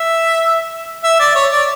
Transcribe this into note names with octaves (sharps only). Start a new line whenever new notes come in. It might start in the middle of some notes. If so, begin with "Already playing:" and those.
Already playing: E5
E5
D5
C#5
D5